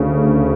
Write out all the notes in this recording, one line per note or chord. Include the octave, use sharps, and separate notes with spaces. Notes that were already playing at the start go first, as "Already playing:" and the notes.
Already playing: D2 C#3